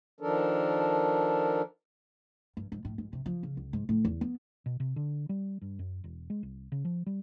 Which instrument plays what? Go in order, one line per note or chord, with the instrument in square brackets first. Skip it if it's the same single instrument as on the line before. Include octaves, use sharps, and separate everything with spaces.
[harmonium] D#3 F3 D4 A4 A#4
[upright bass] G2
G#2
A2
G#2
C3
F3
C#3
C#2
G#2
A2
E2
B3
[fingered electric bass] B2
C3
D3
G3
G2
F#2
E1
G#3
C2
C#3
F3
G3